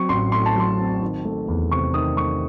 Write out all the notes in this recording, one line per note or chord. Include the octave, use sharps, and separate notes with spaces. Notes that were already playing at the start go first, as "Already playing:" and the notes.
Already playing: F#3 C4 C#6
A1 C6
A2 C6
A5
F#3 C6
C4
D#3
A3
E2
C3 C#6
D#3 D#6
A3 C#6